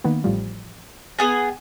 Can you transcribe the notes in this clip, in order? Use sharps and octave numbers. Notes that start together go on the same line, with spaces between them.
D#3 A#3 B3
A1 F3 G3
B3 G#4 G#5 A6